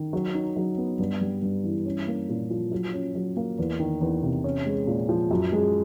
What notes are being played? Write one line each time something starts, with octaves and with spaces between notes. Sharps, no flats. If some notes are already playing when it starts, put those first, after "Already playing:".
Already playing: D#3
F#3
D#4
F#3
B3
G2
G3
G2
E3
C#4
A#3
A#2
F3
F#3
C#4
F#3
A#3
E2
D#3
E2
C3
C#4
G#3
A#2
F3
F#2
G#3